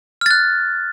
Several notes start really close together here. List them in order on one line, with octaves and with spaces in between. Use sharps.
F6 A6 F#6